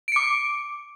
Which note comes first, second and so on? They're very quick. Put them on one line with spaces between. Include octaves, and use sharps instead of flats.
D7 C#7 D6